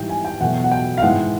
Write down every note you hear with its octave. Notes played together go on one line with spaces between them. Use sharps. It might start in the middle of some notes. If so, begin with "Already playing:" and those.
Already playing: G#2 E3 G3 G5
G#5
G5
E2 B2 F#3 A3 F#5
F#5
G5
F5
G#2 E3 G#3 F#5